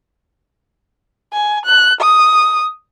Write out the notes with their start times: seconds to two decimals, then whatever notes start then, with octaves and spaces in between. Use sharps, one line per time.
1.33 G#5
1.66 F#6
2.01 D#6